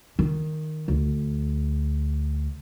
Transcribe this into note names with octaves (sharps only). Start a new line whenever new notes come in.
D#3
D2